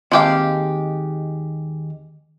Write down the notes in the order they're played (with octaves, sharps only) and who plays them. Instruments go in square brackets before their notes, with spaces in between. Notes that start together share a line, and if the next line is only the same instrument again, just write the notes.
[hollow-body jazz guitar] D#2 C4 A5 [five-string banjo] G#3 G4 F5